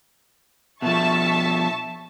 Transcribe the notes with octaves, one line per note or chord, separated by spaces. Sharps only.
B2 F3 E5 A5 C#6